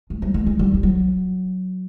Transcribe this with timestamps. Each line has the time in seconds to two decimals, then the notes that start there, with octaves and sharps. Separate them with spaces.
0.10 G#3
0.22 G3
0.34 G#3
0.46 G#3
0.59 G3
0.74 G3
0.83 F#3